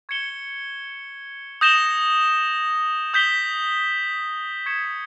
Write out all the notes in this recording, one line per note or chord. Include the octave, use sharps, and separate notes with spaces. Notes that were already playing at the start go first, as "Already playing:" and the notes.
C#6 G#6 C#7 E7 G7
D#6 G6 A#6 E7 G7
D#6 G6 B6 G7
C#6 G#6 C#7 E7